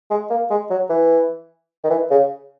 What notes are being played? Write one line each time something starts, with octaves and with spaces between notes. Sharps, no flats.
G#3
A#3
G#3
F#3
E3
D#3
E3
C#3